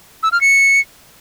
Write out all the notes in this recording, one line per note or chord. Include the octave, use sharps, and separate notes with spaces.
E6
F6
C#7